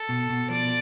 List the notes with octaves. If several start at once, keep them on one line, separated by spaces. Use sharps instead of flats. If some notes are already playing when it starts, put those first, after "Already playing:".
Already playing: A4
B2
B2
F3 D5